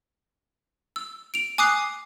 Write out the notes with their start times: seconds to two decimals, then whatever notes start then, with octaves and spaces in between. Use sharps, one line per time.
0.96 E6
1.34 D7 F7
1.58 G#5 D6 D#6 F#6 C7